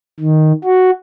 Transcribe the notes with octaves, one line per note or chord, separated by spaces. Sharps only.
D#3
F#4